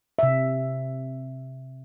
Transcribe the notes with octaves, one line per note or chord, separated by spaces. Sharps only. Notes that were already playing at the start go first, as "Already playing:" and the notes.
C3 E5